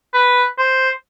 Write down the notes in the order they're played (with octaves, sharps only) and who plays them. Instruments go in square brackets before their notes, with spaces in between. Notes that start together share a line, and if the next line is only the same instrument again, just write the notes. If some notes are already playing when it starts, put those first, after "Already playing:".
[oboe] B4
C5